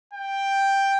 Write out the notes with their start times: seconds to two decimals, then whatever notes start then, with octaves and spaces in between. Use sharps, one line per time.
0.13 G5